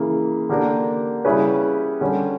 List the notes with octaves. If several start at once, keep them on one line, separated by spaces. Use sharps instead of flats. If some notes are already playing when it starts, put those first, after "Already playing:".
Already playing: C#3 E3 A#3
D3 A#3 D4 G4 A#4
C#3 G3 C#4 E4 B4
D3 G3 C#4